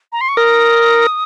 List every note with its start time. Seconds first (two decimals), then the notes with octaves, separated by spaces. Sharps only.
0.12 A#5
0.21 C6
0.29 C#6
0.37 A#4 D#6